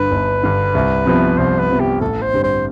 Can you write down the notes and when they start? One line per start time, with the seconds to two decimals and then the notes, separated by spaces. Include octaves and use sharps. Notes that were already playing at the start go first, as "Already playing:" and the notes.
Already playing: G1 G2 D3 B4
0.11 G1
0.43 G2 D3
0.75 C2
1.06 C3 F3 B3
1.38 C2 C5
1.59 B4
1.70 C3 F3 B3
1.80 G4
2.01 A1 A4
2.22 C5
2.33 G2 D3 G3 C4
2.44 C5